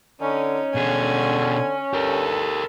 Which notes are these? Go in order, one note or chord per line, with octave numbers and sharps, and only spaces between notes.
D3 C#4 D#4
B2 D3 G#4 G#5
G2 G4 A4 A#4